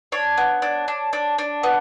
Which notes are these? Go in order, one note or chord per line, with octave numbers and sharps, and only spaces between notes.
D4 C#5
B3
D4
D4
D4
D4
B3